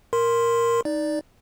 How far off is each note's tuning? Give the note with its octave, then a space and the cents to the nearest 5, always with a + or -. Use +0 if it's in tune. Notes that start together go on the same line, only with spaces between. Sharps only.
A#4 +0 C6 +0
D#4 +0 D5 +0